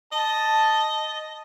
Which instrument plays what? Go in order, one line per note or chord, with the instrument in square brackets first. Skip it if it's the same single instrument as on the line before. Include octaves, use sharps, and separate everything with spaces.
[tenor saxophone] D#5 [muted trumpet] A5